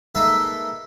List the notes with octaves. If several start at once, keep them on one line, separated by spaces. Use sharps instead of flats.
G#3 A#3 D#4 A4 B4 E5